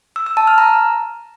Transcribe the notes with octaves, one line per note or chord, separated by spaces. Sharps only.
E6
E6
A5
F6
A#5